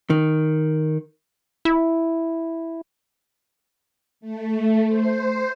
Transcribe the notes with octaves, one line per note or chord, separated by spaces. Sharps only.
D#3
E4
A3
C5